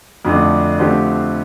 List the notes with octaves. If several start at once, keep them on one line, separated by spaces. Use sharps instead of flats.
F2 D3 A3 D4
D3 F3 A3 C4 G4